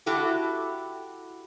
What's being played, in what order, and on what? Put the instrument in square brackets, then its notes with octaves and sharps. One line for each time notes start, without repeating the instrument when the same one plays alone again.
[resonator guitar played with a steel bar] E4 F#4 G4 A4